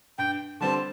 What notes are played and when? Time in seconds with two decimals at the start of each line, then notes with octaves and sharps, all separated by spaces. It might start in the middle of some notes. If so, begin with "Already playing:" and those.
0.18 G2 G5
0.61 D3 G3 C4 A5